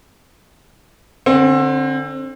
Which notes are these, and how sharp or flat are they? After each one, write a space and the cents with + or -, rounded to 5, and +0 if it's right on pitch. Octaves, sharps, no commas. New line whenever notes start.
D3 +5 C4 +30